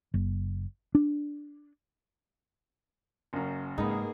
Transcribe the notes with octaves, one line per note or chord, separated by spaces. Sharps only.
F#1
D4
F#1 F#2
G#2 A#3 B3 D#4 G#4